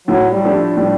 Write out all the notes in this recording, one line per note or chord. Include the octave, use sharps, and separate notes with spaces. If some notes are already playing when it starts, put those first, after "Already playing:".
A2 F#3
G3
F3 A3 D4
A2 G3